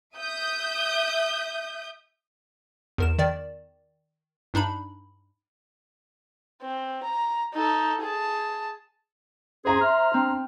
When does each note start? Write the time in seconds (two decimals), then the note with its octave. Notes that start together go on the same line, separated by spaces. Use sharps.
0.15 E5 D#6 G6
2.98 E2 A#4 E7
3.18 D#3 D5
4.54 G2 D4 D#4 B5
6.62 C4
7.03 A#5
7.54 D#4 A4
8.02 G#4 A5
9.65 C#4 G#4 C5 A#5 C6
9.81 E5 F6
10.14 C4 D4